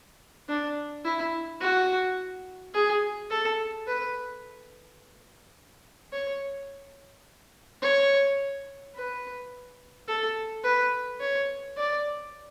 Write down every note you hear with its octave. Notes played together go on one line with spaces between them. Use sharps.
D4
E4
F#4
G#4
A4
B4
C#5
C#5
B4
A4
B4
C#5
D5